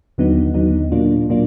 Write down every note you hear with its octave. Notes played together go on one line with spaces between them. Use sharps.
D#2 D3 F#3 B3 D#4
D#2 D3 F#3 B3 D#4
A#2 F#3 A#3 D4 F4
A#2 F#3 A#3 D4 F4